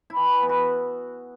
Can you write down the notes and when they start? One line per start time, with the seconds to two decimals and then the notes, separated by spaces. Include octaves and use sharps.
0.10 E4
0.16 E3
0.42 B3
0.49 F#4